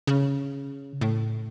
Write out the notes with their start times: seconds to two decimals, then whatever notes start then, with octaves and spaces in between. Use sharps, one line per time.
0.07 C#3
1.01 A2